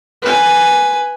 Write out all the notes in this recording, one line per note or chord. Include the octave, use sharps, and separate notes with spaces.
B4 G#5